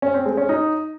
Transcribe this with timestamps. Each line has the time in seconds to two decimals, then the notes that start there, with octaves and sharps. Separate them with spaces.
0.02 C#4
0.14 C4
0.26 G#3
0.37 C#4
0.49 D#4